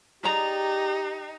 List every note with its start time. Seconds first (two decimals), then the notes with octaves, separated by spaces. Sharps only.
0.24 D#4 G4 G#4 D5 A#5